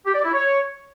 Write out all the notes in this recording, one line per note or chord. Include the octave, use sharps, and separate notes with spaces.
G4
D5
E4
C#5